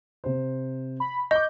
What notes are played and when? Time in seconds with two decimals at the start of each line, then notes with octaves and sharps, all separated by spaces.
0.24 C3 C5
1.00 B5
1.31 D#5 C#6 D6 G6